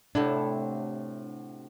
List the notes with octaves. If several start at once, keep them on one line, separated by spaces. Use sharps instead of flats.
A2 C3 D4 E4 F#4 A4